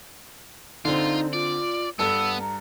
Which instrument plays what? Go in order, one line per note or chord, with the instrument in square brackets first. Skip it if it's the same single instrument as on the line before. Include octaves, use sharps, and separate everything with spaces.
[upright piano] D3 C4 [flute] D#4 [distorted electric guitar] F4
[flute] F4 [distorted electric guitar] D5
[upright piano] G2 A4 [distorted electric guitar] B3 [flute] E6
[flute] A#5